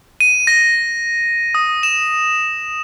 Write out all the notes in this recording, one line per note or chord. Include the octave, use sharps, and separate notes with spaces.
D#7
A#6
D#6
E7